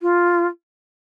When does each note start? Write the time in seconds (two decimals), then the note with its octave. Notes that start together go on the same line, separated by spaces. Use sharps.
0.02 F4